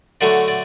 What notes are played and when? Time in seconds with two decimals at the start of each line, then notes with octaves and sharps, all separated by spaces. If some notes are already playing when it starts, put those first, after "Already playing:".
0.21 D3 F#3 A3 D5
0.48 D5